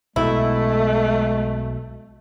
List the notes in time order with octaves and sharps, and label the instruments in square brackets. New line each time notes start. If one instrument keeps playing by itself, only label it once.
[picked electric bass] B1 B2 [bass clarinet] G#3 [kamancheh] A3 [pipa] E4